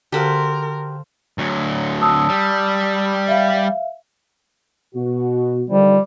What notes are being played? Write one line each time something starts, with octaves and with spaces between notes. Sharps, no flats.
D3 F#4 G4 A4 A#4 C5 F5
D2 F#3
A5 D#6 E6
G3
E5 F5
B2 F#4
D3 D#3 F3 G3